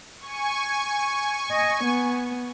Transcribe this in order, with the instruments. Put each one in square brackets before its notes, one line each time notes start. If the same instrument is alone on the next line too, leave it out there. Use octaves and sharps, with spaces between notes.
[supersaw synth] G#5 C#6
[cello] D#5
B3